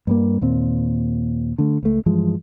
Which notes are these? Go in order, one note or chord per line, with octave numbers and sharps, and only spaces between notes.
G2 G3 A#3
D#2 A#2 C4
D3 A3
C#2 A3
G2 E3 F3 G#3